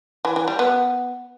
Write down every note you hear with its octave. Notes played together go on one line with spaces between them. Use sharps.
E3
E3
G3
B3